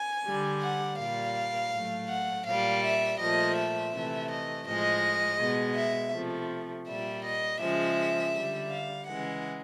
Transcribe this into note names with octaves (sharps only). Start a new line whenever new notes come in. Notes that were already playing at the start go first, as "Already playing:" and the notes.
Already playing: G#5
D3 G3
F#5
A#2 G3 F5
A2 F#3 A3
F#5
A#2 G3 F5
E5
A#2 F3 A3 D#5
E5
C3 E3 A3
D#5
A2 F3 G#3 D#5
B2 G#3
E5
C3 F3 A3
A#2 G3 E5
D#5
C#3 F3 G#3 E5
D3 G3
F5
C#3 E3 G#3 F#5